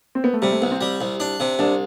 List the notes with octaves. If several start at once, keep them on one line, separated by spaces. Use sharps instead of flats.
C4
B3
A3
C3 G3
A3
C2 B3
C4
G3
C2
D4
C3
C2 D4